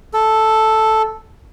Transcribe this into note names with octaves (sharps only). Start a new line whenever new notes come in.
A4